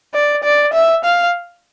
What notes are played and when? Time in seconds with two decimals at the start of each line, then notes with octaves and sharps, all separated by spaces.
0.14 D5
0.44 D5
0.73 E5
1.04 F5